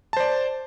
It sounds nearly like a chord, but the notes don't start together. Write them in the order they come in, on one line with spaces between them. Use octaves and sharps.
A5 C5 D5